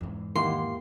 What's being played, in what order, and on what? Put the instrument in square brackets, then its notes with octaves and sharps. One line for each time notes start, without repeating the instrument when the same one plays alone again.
[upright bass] E2 G#2
[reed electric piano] D#3 E4 F#5 [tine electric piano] A#3 G4 [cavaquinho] C6